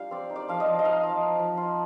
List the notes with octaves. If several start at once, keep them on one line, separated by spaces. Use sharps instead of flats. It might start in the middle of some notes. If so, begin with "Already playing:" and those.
Already playing: G3 D4 F4 F5
C4 D5
D#4
D5
F3 F5
D#5
F3
D#5
D#4 F5
F3
D#4
F3
F4